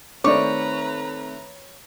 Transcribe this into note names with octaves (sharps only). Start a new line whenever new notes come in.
D#3 A3 C4 B4 C#5 D5 A#5 D6